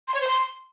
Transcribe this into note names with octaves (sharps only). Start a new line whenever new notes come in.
C6
C#5
C5
C6